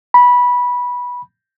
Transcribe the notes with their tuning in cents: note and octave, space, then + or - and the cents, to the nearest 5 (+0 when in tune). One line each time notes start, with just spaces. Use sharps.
B5 -15